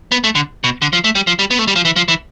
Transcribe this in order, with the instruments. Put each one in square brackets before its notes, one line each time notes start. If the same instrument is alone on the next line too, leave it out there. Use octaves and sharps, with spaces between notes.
[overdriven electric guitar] B3
A3
D3
B2
D3
F3
A3
G3
F3
G3
B3
A3
G3
F3
E3
F3
E3